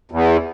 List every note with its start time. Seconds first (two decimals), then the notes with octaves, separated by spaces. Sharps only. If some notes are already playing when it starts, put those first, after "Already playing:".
0.12 E2